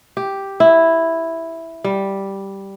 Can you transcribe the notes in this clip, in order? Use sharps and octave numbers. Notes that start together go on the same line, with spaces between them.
G4
E4
G3